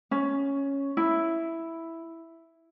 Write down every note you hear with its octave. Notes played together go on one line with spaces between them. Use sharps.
C#4
E4